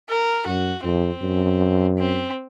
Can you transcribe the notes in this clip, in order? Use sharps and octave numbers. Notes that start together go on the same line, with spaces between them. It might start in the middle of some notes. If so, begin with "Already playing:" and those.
A#4
F#2 F#4
F2 C4
F#2
C4